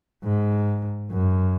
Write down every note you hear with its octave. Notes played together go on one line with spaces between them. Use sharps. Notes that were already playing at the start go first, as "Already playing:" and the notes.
G#2
F#2